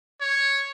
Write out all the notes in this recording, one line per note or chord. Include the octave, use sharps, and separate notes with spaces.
C#5